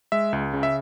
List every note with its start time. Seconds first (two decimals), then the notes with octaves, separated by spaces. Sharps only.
0.12 G#3 E5
0.33 C#2
0.54 C#3
0.63 E5